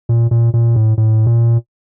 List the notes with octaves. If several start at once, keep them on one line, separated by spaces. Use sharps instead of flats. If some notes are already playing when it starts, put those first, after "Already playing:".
A#2
A#2
A#2
A2
A2
A#2